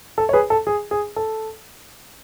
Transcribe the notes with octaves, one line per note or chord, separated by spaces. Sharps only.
A4
C#5
G#4 B4
A4
G#4
G#4
A4